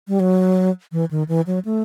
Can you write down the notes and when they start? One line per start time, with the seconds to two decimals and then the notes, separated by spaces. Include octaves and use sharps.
0.08 G3
0.20 F#3
0.92 E3
1.11 D#3
1.29 E3
1.47 F#3
1.65 A3